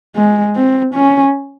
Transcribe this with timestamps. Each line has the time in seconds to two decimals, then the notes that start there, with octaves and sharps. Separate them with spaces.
0.16 G#3
0.55 C4
0.94 C#4